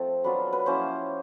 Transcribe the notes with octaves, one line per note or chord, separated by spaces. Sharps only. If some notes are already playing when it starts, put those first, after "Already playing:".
Already playing: F3 A3 C4 A4
F#3 B3 D4 F4 B4
B4
F3 A#3 C#4 E4 C5